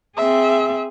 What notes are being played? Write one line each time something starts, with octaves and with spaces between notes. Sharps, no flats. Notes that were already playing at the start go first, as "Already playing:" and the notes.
C4 G#4 E5